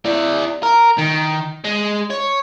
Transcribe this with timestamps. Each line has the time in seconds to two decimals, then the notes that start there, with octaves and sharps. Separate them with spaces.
0.06 E4 D5
0.63 A#4
0.99 D#3
1.65 G#3
2.10 C#5